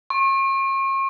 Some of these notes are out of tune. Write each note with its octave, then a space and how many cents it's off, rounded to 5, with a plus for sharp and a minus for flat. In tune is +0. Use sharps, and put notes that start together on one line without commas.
C#6 -40